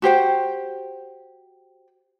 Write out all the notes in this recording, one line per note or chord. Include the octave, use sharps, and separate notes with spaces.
F#4 G4 C5 G5